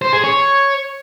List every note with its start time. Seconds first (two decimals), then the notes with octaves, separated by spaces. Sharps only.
0.02 C5
0.13 G#4
0.24 C#5